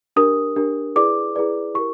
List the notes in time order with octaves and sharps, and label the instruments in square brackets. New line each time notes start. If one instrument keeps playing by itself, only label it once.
[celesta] D4 G4 A#4 D#6
D4 G4 A#4
E4 G#4 B4 D5 D6
E4 G#4 B4 D5
E4 G4 A#4 C#6